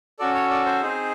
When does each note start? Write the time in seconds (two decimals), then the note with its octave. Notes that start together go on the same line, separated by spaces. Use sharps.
0.19 C#4 F#4 A4 D5
0.35 C#5
0.50 D5
0.66 C5
0.81 C4 D#4 G#4